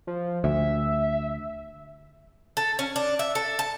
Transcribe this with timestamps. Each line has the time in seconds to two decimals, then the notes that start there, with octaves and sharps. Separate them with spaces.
0.07 F3
0.44 D2 E5
2.57 A4
2.79 C#4
2.96 D4
3.19 E5
3.35 A4
3.59 A5